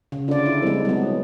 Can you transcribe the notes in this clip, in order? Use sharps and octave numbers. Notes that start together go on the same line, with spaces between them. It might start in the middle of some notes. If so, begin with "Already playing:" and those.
C#3
D3 F4 D5
E4
C2 F3 G#3
F#3 B3